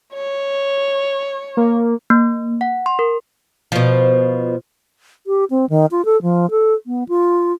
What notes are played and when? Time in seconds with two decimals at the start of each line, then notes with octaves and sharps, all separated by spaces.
0.14 C#5
1.57 A#3
2.10 A#3
2.61 F#5
2.86 C6
2.99 A#4
3.72 B2 F3
5.27 G4
5.50 C4
5.70 D#3
5.91 F4
6.05 A4
6.22 F3
6.51 A4
6.87 B3
7.09 F4